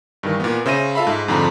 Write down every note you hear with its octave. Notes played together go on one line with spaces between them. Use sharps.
G2 D#3 E3
A#2 B3
C#3 C5 E5 A#6 D#7
F4 A4 E5 F5 B5
G#2
F2 G#2 D3 F3 A#5